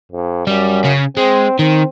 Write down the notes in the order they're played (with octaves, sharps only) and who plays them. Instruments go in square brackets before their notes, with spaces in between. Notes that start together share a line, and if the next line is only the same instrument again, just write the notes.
[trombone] F2
[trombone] F#2 [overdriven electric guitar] G3
[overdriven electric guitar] C#3
[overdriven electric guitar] G#3 [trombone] C4
[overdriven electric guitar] D#3 [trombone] C4